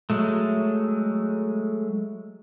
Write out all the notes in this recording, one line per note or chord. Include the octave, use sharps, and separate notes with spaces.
F#3 G#3 A3